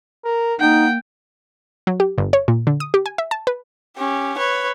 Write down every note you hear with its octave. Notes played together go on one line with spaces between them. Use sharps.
A#4
A#3 D#4 F#5 G5
F#3
G4
G1
C#5
A#2
D3
D#6
G4
G#5
E5
A5
B4
C#4 G4
B4 C#5